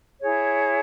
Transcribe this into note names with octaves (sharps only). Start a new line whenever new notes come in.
E4 G#4 C#5